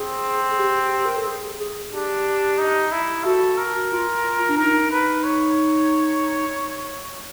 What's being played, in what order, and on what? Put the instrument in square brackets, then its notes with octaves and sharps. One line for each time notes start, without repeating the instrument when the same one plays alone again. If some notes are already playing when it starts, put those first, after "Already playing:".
Already playing: [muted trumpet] C4 [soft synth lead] G#4
[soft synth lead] G#4
G4
A#4
A4
G#4
G#4
[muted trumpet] D4 [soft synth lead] G4
[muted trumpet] D#4
E4
[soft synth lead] F#4 [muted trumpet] A4
[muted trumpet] A#4
[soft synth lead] F4
D4
[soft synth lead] D#4 [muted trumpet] A#4
[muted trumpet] B4
C#5